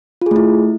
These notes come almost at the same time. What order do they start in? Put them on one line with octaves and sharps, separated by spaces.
F4 G#4 A3 E4